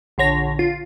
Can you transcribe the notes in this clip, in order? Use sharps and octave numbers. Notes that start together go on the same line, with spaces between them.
A#1 D3 C#5 A#6
F4